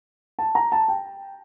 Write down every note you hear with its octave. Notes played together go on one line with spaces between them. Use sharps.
A5
A#5
A5
G5